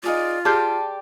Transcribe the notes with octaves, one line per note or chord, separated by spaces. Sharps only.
D#4 F4 G#4 D5
G4 G#4 D5 A5 C6 F6 G6